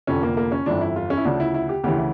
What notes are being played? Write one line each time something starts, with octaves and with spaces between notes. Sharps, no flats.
F1 F2 D3 C#4
A#3
A#3
C#4
G1 F2 E3 D4
E4
F4
C#4
E4
D2 C#3 F3 D4
E4
E4
G4
D2 C#3 E3 G4
E4